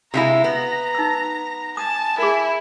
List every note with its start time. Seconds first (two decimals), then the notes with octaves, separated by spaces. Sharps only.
0.14 C3 G#3 E4 F#4 F5 G#5 A#5
0.44 B3 A#6
0.95 D#4 E6
1.77 G#5 A5 D#6
2.18 E4 G#4 A#4